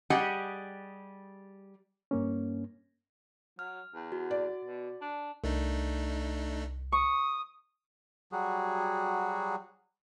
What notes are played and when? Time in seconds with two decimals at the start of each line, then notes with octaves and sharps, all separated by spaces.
0.10 G3 G4 G#4 D#5 F#5
2.11 G2 A#3 C#4
3.59 F#3 F6
3.95 E2
4.12 F#4
4.31 D5
4.65 B2
5.01 D4
5.44 C2 A3 D4 D#4
6.92 C#6 D#6
8.32 F#3 G3 F#4 G#4